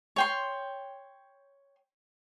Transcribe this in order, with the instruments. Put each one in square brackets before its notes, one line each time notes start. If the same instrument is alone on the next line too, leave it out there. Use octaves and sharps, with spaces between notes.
[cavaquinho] C#5 G5 C6